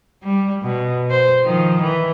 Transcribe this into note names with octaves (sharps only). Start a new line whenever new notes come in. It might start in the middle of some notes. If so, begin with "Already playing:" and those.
G3
B2
C5
D#3 F3
E3